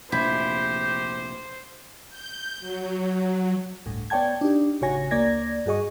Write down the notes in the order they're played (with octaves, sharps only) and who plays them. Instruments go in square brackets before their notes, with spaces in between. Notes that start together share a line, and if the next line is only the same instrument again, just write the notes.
[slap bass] F1 A#1 [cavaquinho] E4 [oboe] G4 [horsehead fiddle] C5
[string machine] G6
F#3
[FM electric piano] G1 D2 A2
B3 C#5 D5 G5 A5 G#6
D4 D#4 G4
A1 C#3 F#4 C#5 G#5 A#6
D2 A#3 D5 G#6 A#6
G2 F#4 G#4 D#5 C#6